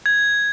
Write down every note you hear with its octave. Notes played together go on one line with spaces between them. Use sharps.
G#6